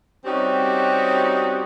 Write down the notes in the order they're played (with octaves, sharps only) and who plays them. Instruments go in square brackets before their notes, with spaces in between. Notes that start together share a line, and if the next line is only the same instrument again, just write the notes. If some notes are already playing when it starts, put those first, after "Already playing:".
[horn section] G3 C4 C#4 D#4 F#4 G4